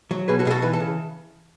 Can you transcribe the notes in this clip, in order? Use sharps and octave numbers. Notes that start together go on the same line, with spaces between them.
F#3
B2 G#4 B4
F#4 A4
B2 G#4
F#4 A4
E3 B4
A4
C#3